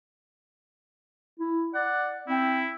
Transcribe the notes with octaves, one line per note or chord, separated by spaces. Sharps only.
E4
D5 F#5
C4 E4